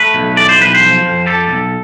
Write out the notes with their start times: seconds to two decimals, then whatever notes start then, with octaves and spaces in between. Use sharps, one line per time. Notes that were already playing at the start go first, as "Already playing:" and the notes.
Already playing: A3 B4
0.14 B1
0.37 E3 D5
0.49 C5
0.59 B1 B4
0.75 C5
0.81 F3
1.04 F2
1.26 G3 A4
1.48 B1